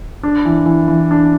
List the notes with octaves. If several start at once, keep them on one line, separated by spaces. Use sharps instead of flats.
D4
E3
E3
E3
D4